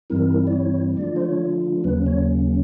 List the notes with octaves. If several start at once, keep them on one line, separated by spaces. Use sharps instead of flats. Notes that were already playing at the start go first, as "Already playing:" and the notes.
G2 E3 G3 C4 E4 A#4
D5
C#5
D3 F3 A3 D4 F4 D5
C5
C#5
D#2 C#3 F#3 A#3 C#4 B4
C#5